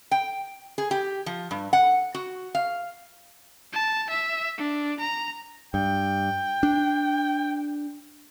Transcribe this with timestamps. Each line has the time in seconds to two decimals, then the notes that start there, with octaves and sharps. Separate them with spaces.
0.11 G5
0.78 G#4
0.91 G4
1.26 F3
1.51 G2
1.73 F#5
2.15 F#4
2.55 F5
3.73 A5
4.10 E5
4.58 D4
5.00 A#5
5.74 G2 G5
6.63 D4